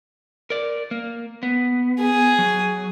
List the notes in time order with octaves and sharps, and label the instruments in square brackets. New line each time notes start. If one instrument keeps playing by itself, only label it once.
[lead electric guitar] A#4 D5
A#3
B3
[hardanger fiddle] G#4
[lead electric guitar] F#3